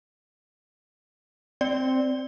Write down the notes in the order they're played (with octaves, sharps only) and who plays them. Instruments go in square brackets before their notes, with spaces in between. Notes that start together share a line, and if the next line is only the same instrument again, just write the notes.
[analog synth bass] C4 [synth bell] D5